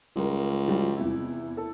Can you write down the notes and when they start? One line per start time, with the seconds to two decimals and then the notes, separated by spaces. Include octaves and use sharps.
0.16 C#2 G3 A#4
0.66 F3 G3 F#4
0.97 E2 C3 E4
1.57 E4 A4